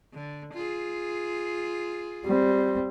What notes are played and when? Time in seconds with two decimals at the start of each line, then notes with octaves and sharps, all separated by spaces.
0.13 D3
0.53 F4 G#4
2.25 G3 C4